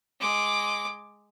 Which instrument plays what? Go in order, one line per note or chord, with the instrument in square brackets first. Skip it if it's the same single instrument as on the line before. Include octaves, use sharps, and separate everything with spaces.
[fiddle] G#3 D6